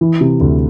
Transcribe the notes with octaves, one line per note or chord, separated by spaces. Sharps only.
E3
C3
D2